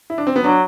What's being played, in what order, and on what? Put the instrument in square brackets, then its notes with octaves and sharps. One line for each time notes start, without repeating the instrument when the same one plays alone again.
[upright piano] E4
D4
C4
B3
[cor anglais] F#3 [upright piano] D4